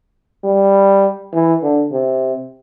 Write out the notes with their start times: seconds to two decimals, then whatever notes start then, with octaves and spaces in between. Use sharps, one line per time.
0.44 G3
1.33 E3
1.62 D3
1.92 C3